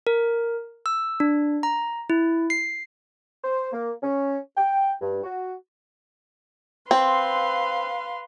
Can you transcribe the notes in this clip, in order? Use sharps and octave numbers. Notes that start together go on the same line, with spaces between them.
A#4
E6
D4
A#5
E4
C7
C5
A#3
C#4
G5
G2
F#4
C4 B4 F5 C6